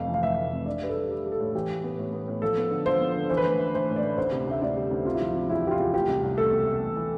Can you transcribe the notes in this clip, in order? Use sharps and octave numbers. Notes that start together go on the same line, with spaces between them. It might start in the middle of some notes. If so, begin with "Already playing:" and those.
Already playing: F1 F2 A3 F5
E3
F5
F1 E5
F1
F2
D4 D5
G4 B4
A4
G3
G3
G3
A4
A2
E3 G4
A2
B3
A2
B3
A2
F3 A4
B3
D3
F3 C5
B3
D3
E3 C5
B4
A3 C5
A3
E3 C5
A2
D5
A3
D2 C5
C3
D2 E5
D2 D5
G3
D2
C3 F4
E4
F3 F4
C3
E2 E4
E2 G4
F4
E2
A3 G4
C2
C2
A3 A4
B2
A3
E3
E3